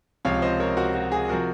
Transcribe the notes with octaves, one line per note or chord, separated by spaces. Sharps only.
C#2 C3 F3 C#5 F5
C5 D#5
A#4 C#5
F#4 A#4
F#4
G#4
C3 F3 F#4 A#4